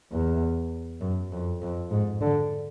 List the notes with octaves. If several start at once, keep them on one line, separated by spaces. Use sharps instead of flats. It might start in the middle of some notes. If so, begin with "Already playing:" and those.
E2
F#2
F2
F2
G#2
D3